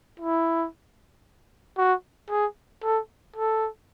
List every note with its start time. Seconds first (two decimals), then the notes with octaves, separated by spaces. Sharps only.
0.20 E4
1.78 F#4
2.30 G#4
2.83 A4
3.37 A4